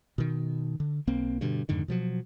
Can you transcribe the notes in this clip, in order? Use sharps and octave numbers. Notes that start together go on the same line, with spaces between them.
B2 D#3
D3
B1 A#3 C4
G2 B2 D3
F2 G#2 D3 D#3
B2 F3 F#3